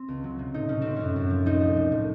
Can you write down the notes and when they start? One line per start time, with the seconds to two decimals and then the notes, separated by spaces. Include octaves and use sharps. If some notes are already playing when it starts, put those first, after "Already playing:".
Already playing: C4
0.08 C#2
0.24 F#3
0.39 C3
0.54 A2 D#4
0.69 A2 C#4
0.82 F#3 C4
0.96 F#2 C#4
1.16 F#2
1.30 F3
1.46 C2 D#4
1.61 F3
1.76 A#2
1.92 A2